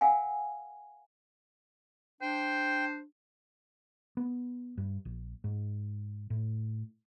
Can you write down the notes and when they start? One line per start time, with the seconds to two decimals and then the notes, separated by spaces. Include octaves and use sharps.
0.01 A#4 F5 F#5 G#5
2.22 D4 C5 G5
4.17 B3
4.78 G2
5.05 A#1
5.44 G#2
6.30 A2